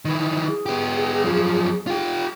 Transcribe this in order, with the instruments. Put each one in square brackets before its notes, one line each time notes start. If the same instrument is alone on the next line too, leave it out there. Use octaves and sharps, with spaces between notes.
[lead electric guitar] D#3 E3
[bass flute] G#4
[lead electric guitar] B3 G4
F#2 F3
F4 G4